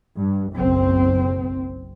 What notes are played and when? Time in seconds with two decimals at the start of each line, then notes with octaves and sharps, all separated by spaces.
0.17 G2
0.54 F#1 B1 C4